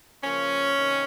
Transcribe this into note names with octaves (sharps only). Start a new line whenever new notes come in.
C#3 F3 A#3 C#4
C3 D#3 A#3